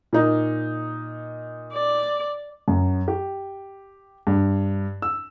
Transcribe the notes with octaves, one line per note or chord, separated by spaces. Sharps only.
A#2 D#4
D5
F#2
G4
G2
E6